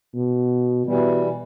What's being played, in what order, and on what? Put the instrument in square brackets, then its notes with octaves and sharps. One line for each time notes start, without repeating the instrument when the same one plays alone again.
[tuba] B2
[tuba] B2 [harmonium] E3 G3